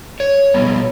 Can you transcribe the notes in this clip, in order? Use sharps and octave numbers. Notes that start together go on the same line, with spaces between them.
C#5
B2 G3 B3